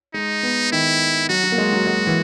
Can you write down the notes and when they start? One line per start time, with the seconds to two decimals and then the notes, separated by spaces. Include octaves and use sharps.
0.14 G#3 D#4
0.43 B3
0.72 D#3 E4
1.29 F#3 F#4
1.44 F#3
1.52 A#3
1.58 G#3
1.72 F#3
1.87 G#3
2.07 E3